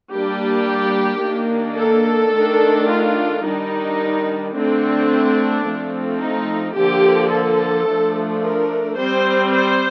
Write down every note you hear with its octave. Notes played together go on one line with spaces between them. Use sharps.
G3 A#3 D4 G4
D#3 A#3 D4
A4
D#3 A3 D4
F4
D#3 G3 D4 D#4
D3 A3 C4 D4
F3 A3 C4
D#4
D3 F3 A#3 G4
A4
F3 A3 D4
A#4
G3 C4 C5
C5